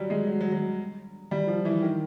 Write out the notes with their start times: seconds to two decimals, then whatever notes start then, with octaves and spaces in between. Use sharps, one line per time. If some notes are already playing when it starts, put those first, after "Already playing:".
Already playing: F#3 G3
0.10 G#3
0.27 F#3
0.41 F#3
0.52 F#3
1.31 G3
1.47 F3
1.65 E3
1.82 D#3